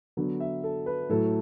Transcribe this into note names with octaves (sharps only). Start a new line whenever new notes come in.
D3 F#3 B3
E5
A4
B4
A2 F#3 A3 A4